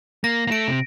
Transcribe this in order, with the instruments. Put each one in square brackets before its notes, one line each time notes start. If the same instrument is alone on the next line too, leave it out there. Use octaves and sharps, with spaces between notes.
[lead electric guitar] A#3 [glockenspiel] A#6
[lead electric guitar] A#3
[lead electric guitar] A3 [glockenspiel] D7
[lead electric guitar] C3